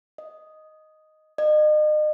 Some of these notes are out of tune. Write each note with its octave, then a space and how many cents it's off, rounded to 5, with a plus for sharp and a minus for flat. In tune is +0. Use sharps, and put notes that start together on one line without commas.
D#5 +0
D#5 -40